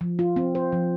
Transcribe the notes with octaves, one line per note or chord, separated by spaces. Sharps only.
F3
F4
C4
C5
F3